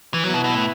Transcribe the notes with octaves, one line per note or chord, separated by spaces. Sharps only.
E3
F#3 B3 E4 B4
B2
B2
A2